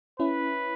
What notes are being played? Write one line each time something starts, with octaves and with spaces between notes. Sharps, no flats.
C#4 E4 B4